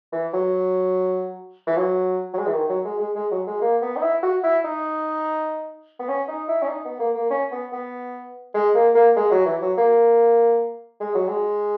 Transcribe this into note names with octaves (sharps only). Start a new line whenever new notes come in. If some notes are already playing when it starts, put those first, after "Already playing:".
E3
F#3
E3
F#3
F#3
G#3
E3
D#3
F#3
G#3
G#3
G#3
F#3
G#3
A#3
B3
D#4
E4
F#4
E4
D#4
B3
C#4
D#4
E4
C#4
D#4
B3
A#3
A#3
C#4
B3
B3
G#3
A#3
A#3
G#3
F#3
E3
F#3
A#3
G#3
F#3
G#3